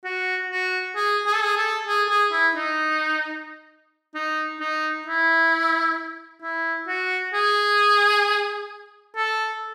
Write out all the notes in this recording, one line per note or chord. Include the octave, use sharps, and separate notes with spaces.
F#4
F#4
G#4
G#4
A4
G#4
A4
G#4
G#4
E4
D#4
D#4
D#4
E4
E4
F#4
G#4
A4